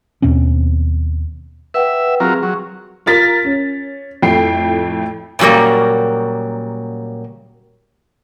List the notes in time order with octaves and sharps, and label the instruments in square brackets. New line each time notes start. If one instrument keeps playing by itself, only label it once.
[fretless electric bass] D#2 B2 C4 C#4
[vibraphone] B4 F#5 G5 [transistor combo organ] E5
[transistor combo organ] F#3 F4 A#4 [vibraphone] C4 G#4
[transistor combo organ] F#3 [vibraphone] C#6
[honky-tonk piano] F4 A#4 A6 B6
C#4
F2 A2 A3 G5 C7
[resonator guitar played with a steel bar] A#2 C#3 F#3 G3 A#3